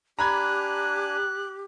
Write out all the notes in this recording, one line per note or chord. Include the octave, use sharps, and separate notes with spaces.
D4 G4 G#5 A#5 B5 F#6 G#6